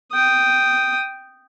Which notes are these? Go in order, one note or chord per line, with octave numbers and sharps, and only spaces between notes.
G5 D#6